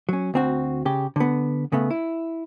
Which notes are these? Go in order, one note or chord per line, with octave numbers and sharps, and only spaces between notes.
F#3 C#4
D2 C4 F#4
C#3 G4
D3 B3
C#3 A3 B3
E4